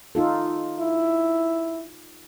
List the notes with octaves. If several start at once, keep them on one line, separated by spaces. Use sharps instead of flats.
D#4 F4 A4
E4